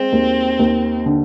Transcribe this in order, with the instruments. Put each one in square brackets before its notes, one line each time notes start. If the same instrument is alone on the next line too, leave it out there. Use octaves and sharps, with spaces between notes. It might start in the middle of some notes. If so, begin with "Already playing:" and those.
Already playing: [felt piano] G#3 [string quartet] C4
[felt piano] D#2
D#2
D3